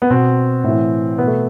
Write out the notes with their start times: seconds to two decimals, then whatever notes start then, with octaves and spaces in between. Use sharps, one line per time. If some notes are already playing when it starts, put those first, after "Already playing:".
0.02 B3
0.10 B2 C4
0.64 A2 E3
1.18 B2 B3
1.27 A3